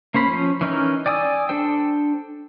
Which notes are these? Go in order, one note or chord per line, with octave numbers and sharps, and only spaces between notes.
A#3 C#4 C5 B5
F3 C#4
E3 C#4 D#4 A#4
D5 G5 G#5 D#6 E6
D4 A4 C5 G5